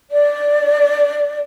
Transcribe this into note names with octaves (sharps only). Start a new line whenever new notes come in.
D5